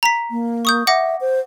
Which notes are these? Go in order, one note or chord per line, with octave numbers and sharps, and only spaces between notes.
A#5 B6
A#3
C#6 D#6 G6
E5 F#5 D6 A#6
C5